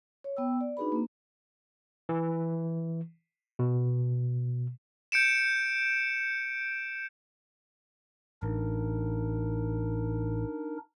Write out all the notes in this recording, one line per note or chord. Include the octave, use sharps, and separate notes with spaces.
C#5
B3 G5 E6
D5
D4 D#4 F#4 G#4 B4 B5
A#3 C4
E3
B2
G6 C#7 D7 E7
A1 D4 D#4 A#4